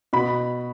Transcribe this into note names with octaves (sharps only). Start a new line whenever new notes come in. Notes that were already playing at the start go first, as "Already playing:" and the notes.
B2 B5